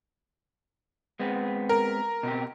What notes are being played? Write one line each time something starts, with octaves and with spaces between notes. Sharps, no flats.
G#3 B3 C4
A#4
B2 C4 G4